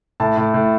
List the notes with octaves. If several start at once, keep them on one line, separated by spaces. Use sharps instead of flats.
A2 A5
A2
A2